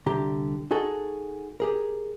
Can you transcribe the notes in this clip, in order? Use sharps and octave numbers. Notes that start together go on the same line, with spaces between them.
C2 D3 G4 A#5
D#4 F#4 G#4 A4
G4 G#4 A#4